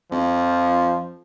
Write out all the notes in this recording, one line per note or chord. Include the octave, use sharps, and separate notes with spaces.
F2 F3